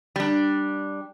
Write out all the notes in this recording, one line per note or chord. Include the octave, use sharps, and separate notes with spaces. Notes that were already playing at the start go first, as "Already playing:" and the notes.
G3 D4